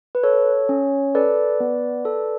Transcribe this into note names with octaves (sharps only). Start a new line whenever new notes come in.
B4
A4 C#5
C#4
A4 B4 D5
B3
A4